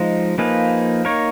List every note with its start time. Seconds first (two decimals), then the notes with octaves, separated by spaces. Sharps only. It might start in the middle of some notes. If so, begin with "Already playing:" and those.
Already playing: F3 G#3 D#4
0.38 F3 A#3 D#4 G#4 B4
1.05 A#3 D#4 A#4 C#5